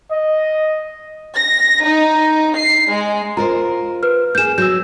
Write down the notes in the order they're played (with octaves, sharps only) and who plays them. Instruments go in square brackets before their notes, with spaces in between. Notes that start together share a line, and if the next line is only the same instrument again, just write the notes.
[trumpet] D#5
[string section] A#6
D#4
C7
G#3
[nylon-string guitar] F4 A#4 C5 [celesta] A#5
[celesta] B4 F6
[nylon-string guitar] A#3 G#4 [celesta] G6 E7
[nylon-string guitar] F#3 [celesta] E6 G6